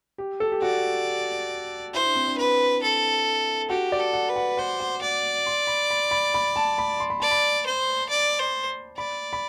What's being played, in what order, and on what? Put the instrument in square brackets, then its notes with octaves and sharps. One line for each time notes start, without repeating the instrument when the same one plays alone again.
[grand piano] G4
A4
G4
[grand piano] F#4 [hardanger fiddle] D5
[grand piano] E4 [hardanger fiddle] C5
[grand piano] D4
C4
D4
[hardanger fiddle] B4
A4
[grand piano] F#4 [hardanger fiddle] G4
[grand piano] D5
[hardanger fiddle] A4
[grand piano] F#5
[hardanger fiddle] B4
[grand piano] F#5
[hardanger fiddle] C5 [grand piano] F#5
[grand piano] F#5
[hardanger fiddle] D5 [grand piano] F#5
[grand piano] C6
B5
B5
B5
B5
A5
B5
C6
B5
[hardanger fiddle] D5 [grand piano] A5
[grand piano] B5
[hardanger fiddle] C5
D5
C5
[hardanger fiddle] D5 [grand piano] B5
[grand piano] B5